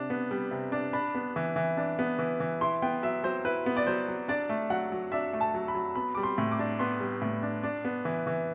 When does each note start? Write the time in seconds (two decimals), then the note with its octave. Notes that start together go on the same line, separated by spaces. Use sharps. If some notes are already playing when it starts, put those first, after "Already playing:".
Already playing: C3 D4
0.10 B3
0.31 G3
0.51 C3
0.72 D4
0.93 D4 B5
1.15 B3
1.36 E3
1.56 E3
1.77 D4
1.99 B3
2.19 E3
2.40 E3
2.61 E4 C6
2.82 B3 G5
3.03 F#3 E5
3.24 F#3 C5
3.45 E4 B4
3.66 B3
3.77 D5
3.87 F#3 C5
4.08 F#3
4.28 D4 D5
4.49 A3
4.70 F#3 F#5
4.92 F#3
5.12 D4 E5
5.33 A3
5.41 A5
5.54 F#3
5.68 B5
5.75 F#3
5.95 B3 B5
6.15 G3 D6
6.23 C6
6.38 A2
6.51 D6
6.59 D4
6.79 B3 C6
7.00 G3
7.22 A2
7.43 D4
7.63 D4
7.85 B3
8.05 E3
8.27 E3